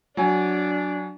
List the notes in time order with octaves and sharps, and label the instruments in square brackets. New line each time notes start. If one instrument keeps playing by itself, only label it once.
[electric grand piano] F#3 G#5 [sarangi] D4